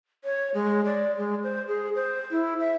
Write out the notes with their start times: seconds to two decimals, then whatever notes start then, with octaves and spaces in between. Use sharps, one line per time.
0.24 C#5
0.54 G#3
0.85 D5
1.17 G#3
1.43 C5
1.68 G#4
1.95 C5
2.31 E4
2.60 E5